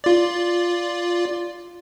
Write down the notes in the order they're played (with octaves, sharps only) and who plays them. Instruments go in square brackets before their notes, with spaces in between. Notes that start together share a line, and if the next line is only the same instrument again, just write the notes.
[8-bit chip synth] F4 D5